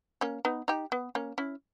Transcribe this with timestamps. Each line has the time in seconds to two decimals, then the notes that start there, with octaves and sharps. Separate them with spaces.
0.21 A#3 C#4
0.45 B3 D#4
0.68 D#4 G4
0.92 B3
1.15 A#3 C#4
1.38 C#4 E4